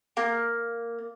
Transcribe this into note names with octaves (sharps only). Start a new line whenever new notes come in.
A#3